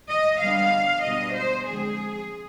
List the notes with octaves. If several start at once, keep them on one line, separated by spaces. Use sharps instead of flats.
D#5
D3 G3 B3 D4 F5
B2 G3 B3 D4 D#5
C5
D3 F3 G#3 C4 G#4